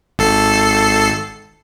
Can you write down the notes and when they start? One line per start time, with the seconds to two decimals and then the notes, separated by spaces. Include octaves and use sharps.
0.19 G#1 A4 C7